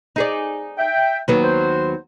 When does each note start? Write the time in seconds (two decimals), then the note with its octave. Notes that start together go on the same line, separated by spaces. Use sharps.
0.16 D#4 G#4 D5
0.78 E5 G5
1.28 D#2 F#3 B3
1.43 C5